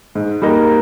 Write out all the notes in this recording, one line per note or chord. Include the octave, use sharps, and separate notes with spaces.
G#2
G3 A#3 D#4 A#4